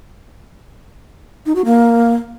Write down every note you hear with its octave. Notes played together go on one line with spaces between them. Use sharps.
D#4
F#4
A#3